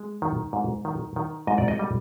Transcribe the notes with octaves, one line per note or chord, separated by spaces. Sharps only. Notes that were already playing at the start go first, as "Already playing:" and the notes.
Already playing: G#3
D#3
G#2
D#3
D#3
G#2 D#5
D5
D#5
G3